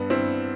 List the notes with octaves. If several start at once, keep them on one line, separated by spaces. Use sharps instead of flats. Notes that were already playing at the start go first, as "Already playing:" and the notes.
Already playing: G2 B3 D4
G2 C4 E4